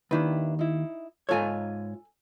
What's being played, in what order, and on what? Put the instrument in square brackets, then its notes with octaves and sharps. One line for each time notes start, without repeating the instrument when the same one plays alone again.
[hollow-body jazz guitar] D#2 D#3 [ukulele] D4 E4 B4
[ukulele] D#4 E4
[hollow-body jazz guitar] G#2 F4 C#5 [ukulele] A4 G#5